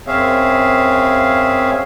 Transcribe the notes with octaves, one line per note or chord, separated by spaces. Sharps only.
F#2 C4 G#4 C#5 E5 F5